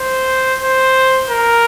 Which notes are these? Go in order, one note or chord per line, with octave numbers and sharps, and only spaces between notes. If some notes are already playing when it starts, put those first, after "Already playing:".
Already playing: C5
C5
A#4